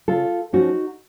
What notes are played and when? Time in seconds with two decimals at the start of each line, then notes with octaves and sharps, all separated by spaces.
0.08 C#3 F4 A4
0.53 F3 A3 C#4 D#4 F#4